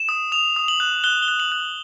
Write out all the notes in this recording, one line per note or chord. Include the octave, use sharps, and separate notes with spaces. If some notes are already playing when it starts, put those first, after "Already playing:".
Already playing: E7
D#6
D#6 F7
D#6
F#7
F#6
F#6 G7
G7
F#6
F#7
F#6